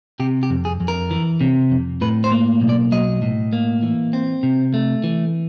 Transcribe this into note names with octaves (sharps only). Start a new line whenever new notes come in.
C3 G4
G4
F2
G#4
F2
A#4
E3
C3
F2
A2 B4
C5
A#3
B1
D5
F#3 D#5
A2
A#3
E3
C4
C3
A3
E3